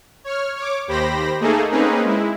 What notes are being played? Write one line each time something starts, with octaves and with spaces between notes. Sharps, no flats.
C#5 F6
C#5 D6
D#2 G4 C5 B5 A#6
A3 A#3 D#4 G#4 A4
A#3 C4 C#4 D#4 G#4 B4
G#3 E4